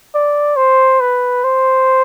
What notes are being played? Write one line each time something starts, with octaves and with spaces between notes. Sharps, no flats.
D5
C5
B4
C5